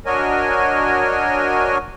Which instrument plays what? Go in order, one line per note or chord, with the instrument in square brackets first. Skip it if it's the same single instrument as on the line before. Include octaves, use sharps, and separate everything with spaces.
[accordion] D4 F#4 A#4 C#5 D#5 G#5